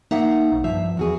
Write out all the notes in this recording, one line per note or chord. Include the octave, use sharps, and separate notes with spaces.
A#3 D#4 E5 F#5
A#1
G2 F3 E5
E2 F#4 G#4